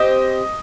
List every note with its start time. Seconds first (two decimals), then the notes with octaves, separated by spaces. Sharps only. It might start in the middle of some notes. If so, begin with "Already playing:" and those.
Already playing: C4 G4 C5 D#5